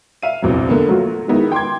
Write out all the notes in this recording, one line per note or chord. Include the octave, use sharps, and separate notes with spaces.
E5 F5 D#7
A#1 E2 C3 F#3
D3 A#3 B3
F#3 A3 F4 F#4
D#3 G#3 B3 D#4 E4
G5 C6 D6 G#6